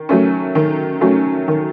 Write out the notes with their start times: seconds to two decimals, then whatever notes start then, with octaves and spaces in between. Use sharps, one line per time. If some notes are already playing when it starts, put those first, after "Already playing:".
Already playing: D#3
0.09 F#3 A3 C#4
0.55 D#3
1.01 F#3 A3 C#4
1.48 D#3